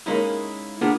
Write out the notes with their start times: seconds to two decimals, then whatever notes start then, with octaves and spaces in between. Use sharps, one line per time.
0.06 G#3 A#3 C#4 D#4 E4
0.81 A#3 B3 D4 F4 G#4